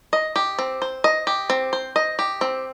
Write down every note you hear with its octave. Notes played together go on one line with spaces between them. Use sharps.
D#5
G4
C4
C5
D#5
G4
C4
C5
D#5
G4
C4